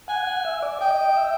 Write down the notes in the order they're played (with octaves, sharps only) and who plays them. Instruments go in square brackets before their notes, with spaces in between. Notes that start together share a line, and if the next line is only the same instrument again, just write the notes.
[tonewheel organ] F#5 [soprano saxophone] G#5
[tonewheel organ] F#5
E5
D5
[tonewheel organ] D#5 [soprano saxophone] G5
[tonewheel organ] E5